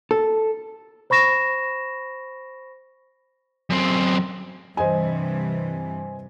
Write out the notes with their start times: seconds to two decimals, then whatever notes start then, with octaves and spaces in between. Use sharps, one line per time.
0.11 A4
1.10 C5 B5 C#6 A#6 E7
3.70 F#2 C4
4.77 G2 C3 E3 C5 D#5 G#5